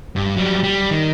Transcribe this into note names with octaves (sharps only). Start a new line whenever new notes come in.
G2
F#3 G3
G3
D#3